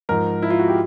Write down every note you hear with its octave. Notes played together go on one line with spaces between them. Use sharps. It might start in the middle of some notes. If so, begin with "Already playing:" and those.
G#2 F3 A#4
E4
F4
F#4
G4